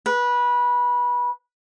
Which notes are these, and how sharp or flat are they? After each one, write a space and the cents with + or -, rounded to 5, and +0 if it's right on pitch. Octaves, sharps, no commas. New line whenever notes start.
B4 -20